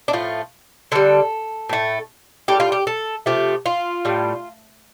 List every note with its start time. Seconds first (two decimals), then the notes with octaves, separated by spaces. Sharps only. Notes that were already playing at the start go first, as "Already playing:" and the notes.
0.08 D4
0.13 A2 F3 A3 F4
0.92 D3 G3 A4
1.69 A2 A3
2.48 A2 G3 G4
2.60 F4
2.72 G4
2.87 A4
3.26 C3 F3 A3 G4
3.66 F4
4.05 A2 G3